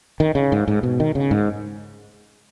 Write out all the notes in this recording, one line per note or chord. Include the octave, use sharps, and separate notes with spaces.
D#3
C#3
G#2
G#2
B2
D#3
C#3
G#2